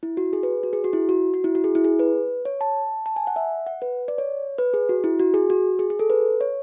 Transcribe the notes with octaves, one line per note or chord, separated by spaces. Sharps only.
E4
F#4
G#4
B4
F#4
G#4
F#4
E4
F#4
F#4
E4
F#4
G#4
E4
G#4
B4
C#5
A5
A5
G#5
F#5
E5
F#5
B4
D5
C#5
B4
G#4
F#4
E4
F#4
G#4
F#4
G#4
G#4
A4
B4
C#5